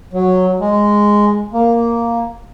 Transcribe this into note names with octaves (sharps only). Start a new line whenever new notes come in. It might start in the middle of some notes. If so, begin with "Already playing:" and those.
F#3
G#3
A#3